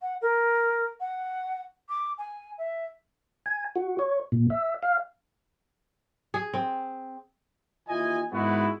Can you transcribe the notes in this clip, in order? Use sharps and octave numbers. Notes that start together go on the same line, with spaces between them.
F#5
A#4
F#5
D6
G#5
E5
G#5
F#4
C#5
A#2
E5
F5
G#4
C4
D#2 E3 F4 D#5 G#5
G#2 D#3 G#3 B3 E4 F#4